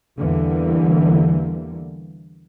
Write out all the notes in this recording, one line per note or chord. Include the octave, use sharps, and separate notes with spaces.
E2 D3 E3 G3 A#3